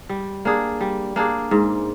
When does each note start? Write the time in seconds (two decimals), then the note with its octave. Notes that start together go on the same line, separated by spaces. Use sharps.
0.09 G3
0.45 A#3 D4 G#4
0.81 G3
1.16 A#3 D4 G#4
1.51 G#2